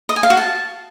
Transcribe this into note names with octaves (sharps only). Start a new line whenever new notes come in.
D#5
G#5
F5
F#4
A5